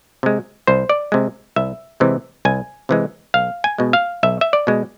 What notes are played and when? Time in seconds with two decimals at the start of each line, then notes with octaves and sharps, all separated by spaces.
0.23 C3 G#3
0.67 C2 C5
0.89 D5
1.12 C3 G#3
1.56 C2 E5
2.00 C3 E3 G#3
2.45 C2 G#5
2.89 C3 E3 G#3
3.34 B1 F5
3.64 G#5
3.78 B2 G#3
3.93 F5
4.23 B1 E5
4.41 E5
4.53 D5
4.67 B2 G#3